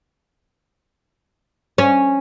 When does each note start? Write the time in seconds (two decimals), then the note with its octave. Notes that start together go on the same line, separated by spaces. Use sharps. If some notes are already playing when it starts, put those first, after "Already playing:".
1.78 C#4